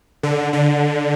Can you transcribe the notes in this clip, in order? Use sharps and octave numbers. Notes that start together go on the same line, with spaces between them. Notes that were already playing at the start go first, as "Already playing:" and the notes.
D3
D3